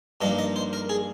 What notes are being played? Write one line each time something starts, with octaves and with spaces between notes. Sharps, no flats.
G2 F3 A#3 D#4 D#5
D#5
C5
A#4
G#4